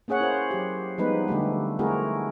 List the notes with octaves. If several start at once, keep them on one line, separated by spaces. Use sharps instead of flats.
A#3 C#4 G#4 C#5 F#5
E4 C5
F#3 G4
F3 G3 G#3 B3 D#4 B4
D3 G3 A3 G4
A3 C4 E4 F#4 G#4 A#4